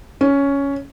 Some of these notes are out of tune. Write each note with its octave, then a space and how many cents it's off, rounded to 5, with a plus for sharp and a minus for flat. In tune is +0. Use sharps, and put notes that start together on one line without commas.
C#4 +10